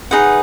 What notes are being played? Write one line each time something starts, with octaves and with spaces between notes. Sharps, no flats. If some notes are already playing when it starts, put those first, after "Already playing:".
D#4 G#4 B4 F#5